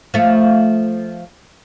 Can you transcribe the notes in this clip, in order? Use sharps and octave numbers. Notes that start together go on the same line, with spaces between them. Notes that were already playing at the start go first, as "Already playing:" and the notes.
F3 A3